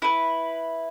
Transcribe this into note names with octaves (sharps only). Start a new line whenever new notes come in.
E4 B4